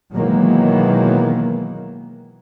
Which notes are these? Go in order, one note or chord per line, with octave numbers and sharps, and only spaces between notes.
B2 D#3 E3 F#3 G#3 A#3